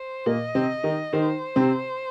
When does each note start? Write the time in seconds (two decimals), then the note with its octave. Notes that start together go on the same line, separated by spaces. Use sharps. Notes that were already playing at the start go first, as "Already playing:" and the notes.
Already playing: C5
0.26 A#2 A#3 D#5
0.55 C3 C4
0.83 D#3 D#4
1.13 D#3 D#4 C5
1.56 C3 C4